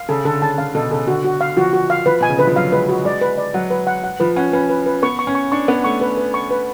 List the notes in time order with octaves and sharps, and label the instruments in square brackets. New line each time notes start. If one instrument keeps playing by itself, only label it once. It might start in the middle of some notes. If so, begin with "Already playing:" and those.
Already playing: [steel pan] F5
[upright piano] C#3 [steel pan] A4
[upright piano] D3 [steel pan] A4
[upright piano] C#3 [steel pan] A5
[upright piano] D3 [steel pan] F5
[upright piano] B2 [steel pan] A4
[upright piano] C#3 [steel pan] A4
[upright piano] D3 [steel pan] F#4
[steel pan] F#4
F5
[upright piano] F3 [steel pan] F#4
[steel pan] F#4
F5
[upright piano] F3 [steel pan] B4
[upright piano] B2 [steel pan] G#5
[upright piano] C#3
[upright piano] D3 [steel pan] B4
[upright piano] F3
[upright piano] F#3 [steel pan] F5
[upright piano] G#3 [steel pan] B4
[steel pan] F#4
[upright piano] G#3 [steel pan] D5
[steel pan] B4
D5
[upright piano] F#3 [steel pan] F#5
[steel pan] B4
F#5
F#5
[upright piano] F3 [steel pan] B4
[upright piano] C#4 [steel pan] F#5
[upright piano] C#4 [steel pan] B4
[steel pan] B4
B4
[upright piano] B3 [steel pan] C#6
[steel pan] C#6
[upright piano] C#4
[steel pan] C#6
[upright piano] D4 [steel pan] C#6
[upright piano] B3 [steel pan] F#5
[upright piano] A3 [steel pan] C#6
[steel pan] B4
B4
C#6
B4